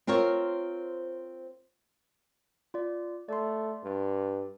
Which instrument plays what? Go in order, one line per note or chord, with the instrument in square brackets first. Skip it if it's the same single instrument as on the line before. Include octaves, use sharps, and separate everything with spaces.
[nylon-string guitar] C4 F4 A#4 C5 C#5
[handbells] F4 D5
[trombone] A3 [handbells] D5 C6
[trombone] G2